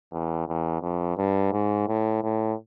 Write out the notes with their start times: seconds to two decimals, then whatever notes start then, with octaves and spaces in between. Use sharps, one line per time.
0.12 E2
0.48 E2
0.82 F2
1.17 G2
1.53 G#2
1.88 A2
2.23 A2